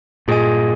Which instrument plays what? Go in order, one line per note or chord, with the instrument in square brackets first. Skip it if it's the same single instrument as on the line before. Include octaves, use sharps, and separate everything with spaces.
[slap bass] G2 A#2 [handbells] F4 G#4 D#5 G#5